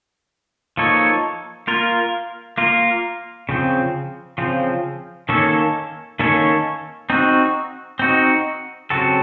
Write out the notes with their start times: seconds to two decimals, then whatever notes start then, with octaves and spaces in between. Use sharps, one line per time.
0.77 F3 A#3 D#4 A4 C#5
1.67 A#3 F4 A#4
2.58 A#3 F4 A#4
3.49 C#3 F3 C4
4.38 C#3 F3 C4
5.29 D#3 A#3 C#4 A4 C#5
6.20 D#3 A#3 C#4 A4 C#5
7.10 C4 D#4 F#4
7.99 C4 D#4 F#4
8.90 C#3 F#3 C4 F#4 A4